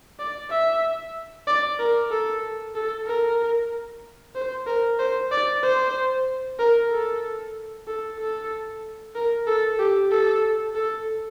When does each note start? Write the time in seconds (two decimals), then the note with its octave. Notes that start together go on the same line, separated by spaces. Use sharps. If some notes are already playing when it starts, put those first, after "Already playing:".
0.19 D5
0.50 E5
1.47 D5
1.79 A#4
2.11 A4
2.75 A4
3.07 A#4
4.35 C5
4.67 A#4
4.99 C5
5.31 D5
5.63 C5
6.59 A#4
6.91 A4
7.87 A4
8.19 A4
9.15 A#4
9.47 A4
9.79 G4
10.11 A4
10.75 A4